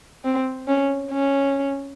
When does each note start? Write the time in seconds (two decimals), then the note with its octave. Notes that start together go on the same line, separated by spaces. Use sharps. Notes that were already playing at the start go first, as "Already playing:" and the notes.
0.24 C4
0.68 C#4
1.11 C#4